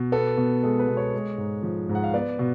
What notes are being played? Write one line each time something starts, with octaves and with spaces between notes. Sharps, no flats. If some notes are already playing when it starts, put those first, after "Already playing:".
Already playing: B2
B3 A4
B2
G#3 A4
B4
B2
C#5
G#3
G#2
F3
G#2
F#5
F5
B3 D5
B2